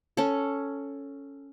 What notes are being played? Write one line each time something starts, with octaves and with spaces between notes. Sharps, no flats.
C#4 A4